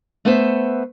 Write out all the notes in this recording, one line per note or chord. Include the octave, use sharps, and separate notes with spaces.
A3 B3 B4 C5 E5